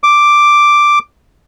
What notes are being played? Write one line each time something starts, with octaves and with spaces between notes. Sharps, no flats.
D6